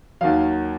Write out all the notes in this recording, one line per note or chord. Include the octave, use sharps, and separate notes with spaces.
D#2 D#3 F#3 F5